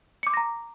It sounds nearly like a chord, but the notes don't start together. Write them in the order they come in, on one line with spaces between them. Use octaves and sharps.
C#7 D6 C6 A#6 A#5